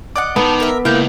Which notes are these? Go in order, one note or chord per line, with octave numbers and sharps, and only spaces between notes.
D5 D#5 F#5 D6
D#3 B3 A4
A#4 E5
C#2 A#3 E4 A#4 G6